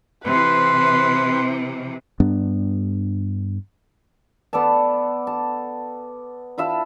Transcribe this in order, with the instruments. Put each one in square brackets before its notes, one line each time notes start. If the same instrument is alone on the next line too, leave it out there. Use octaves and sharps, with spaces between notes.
[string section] C3 E3 [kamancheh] B4 C6
[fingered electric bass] G2 G3 B3 D4
[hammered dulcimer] B3 A4 D5 A5
A5
E4 F4 E5 A5